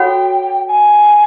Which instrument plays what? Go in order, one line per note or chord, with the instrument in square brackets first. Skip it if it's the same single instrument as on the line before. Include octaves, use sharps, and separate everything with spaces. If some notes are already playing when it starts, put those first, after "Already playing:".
Already playing: [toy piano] F#4 A4 C#5 F#5 B5 [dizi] G5
[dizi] G#5